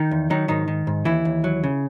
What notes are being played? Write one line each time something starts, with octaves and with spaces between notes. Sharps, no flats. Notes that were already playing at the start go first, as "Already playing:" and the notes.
Already playing: D#3 D#4
E2
D#3 F#3 D#4
G#2 D#3 D#4
D#3
G#2
D#2 E3 E4
D#2
F#3
C#3